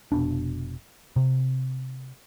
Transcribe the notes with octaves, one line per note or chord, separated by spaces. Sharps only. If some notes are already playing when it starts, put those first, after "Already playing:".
F1 B2 D4
C3